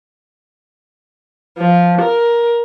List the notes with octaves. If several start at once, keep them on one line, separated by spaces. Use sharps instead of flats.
F3
A#4